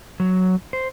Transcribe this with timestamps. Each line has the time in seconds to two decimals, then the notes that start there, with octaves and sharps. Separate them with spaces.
0.20 F#3
0.73 C5